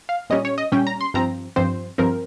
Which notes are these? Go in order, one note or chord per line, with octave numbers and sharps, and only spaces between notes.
F5
A#2 G3 C#4 D#5
C#5
D#5
A#2 G3 C#4 G5
A#5
C6
G2 F3 C4 A#5
G2 F3 C4 C5
G2 F3 C4 A#4